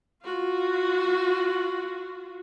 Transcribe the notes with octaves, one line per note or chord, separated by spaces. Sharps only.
F4 F#4